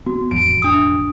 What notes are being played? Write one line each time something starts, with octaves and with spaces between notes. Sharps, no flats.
B3 F#4
E1 A1 F2 D7
D4 D#6